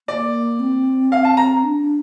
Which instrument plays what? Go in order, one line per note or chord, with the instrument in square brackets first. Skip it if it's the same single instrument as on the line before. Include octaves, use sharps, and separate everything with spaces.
[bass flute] A#3 [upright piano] D5
[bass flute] C4
[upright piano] F5
A5
A#5
[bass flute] D4